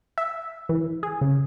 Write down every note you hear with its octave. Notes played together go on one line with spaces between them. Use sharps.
E5
E3
G#4
C#3